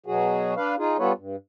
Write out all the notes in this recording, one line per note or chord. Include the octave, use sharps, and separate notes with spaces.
B2 F#3 F#4 G#4
D4 B4 F5
D#4 F4 G#4
G3 B3 F4 A4 B4 C#5
G2